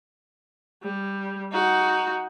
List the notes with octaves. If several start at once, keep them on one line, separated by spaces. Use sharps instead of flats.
G3
D#4 F#4